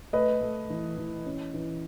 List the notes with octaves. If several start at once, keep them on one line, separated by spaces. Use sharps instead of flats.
A3 B4 D#5
A3
E3
E3
C#4
E3